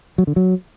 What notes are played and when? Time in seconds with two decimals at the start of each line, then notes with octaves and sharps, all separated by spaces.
0.18 F#3
0.27 D3
0.36 F#3